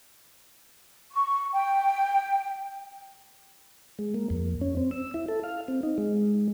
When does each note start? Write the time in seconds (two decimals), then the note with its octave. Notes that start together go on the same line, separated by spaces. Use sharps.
1.12 C#6
1.53 G5
3.99 G#3
4.14 A#3
4.30 F2
4.61 C#4
4.77 C4
4.91 E6
5.14 E4
5.28 A4
5.44 F5
5.68 C4
5.83 D#4
5.98 G#3